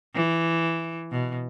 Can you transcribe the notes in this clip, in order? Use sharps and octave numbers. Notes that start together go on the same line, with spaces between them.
E3
B2